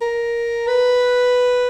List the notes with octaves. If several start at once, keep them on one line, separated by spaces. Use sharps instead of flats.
A#4
B4